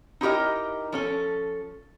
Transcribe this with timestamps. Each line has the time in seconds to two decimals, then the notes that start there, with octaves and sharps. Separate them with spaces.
0.21 D#4 E4 G4 A#4 D#5
0.92 F3 C#4 A4